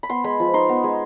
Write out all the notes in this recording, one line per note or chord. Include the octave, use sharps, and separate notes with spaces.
B5
B3 C6
G#3 B5
F3
D#4 C6
B3
G#3